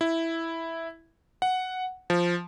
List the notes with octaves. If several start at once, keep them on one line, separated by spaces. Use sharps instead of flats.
E4
F#5
F3